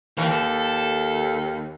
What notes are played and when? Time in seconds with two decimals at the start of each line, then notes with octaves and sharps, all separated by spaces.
0.18 D#2 E3
0.31 A4